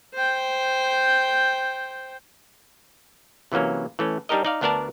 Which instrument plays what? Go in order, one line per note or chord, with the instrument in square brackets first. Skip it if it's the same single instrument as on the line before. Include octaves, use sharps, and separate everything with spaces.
[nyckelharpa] C5 G5
[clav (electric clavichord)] C3 E3 F#3 A#3 C#4
E3 A3 C#4
G3 D4 D#4 G4 A#4 D#5
D#4 D5 F5
D2 B3 D4 A#4 D5 A5